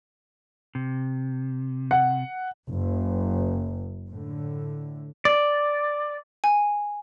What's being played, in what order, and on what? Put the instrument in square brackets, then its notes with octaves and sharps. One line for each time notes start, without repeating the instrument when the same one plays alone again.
[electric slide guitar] C3
[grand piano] F#5
[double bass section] F#1
A2 D3
[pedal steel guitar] D5
[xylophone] G#5